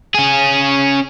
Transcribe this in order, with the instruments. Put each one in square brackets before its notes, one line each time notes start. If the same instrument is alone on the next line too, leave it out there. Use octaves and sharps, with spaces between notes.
[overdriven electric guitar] C#4 G#4